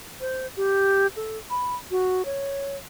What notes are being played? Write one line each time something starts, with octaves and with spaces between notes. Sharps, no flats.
C5
G4
A4
B5
F#4
C#5